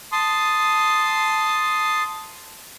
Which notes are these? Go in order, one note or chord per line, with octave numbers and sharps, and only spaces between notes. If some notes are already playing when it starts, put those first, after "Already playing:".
A5 C6 D#6